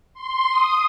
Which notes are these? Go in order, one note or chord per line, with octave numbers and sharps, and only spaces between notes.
C6
D#6